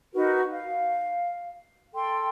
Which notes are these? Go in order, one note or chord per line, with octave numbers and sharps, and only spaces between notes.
D#4 F#4 A#4 B4
F5
A4 G5 C6